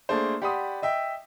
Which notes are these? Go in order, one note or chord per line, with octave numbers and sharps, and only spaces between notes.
A3 A#3 D4 G#4 C5
G4 D5 F#5 B5 C6 D#6
D#5 E5 G5